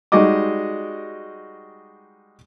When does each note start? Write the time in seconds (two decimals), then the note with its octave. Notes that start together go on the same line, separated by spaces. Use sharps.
0.12 G3 G#3 D#4 F#4 D#5 D6